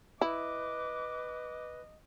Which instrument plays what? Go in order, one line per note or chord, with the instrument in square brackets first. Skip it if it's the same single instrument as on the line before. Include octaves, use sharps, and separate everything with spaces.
[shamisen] E4 [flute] B4 [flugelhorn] D#5 [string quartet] D6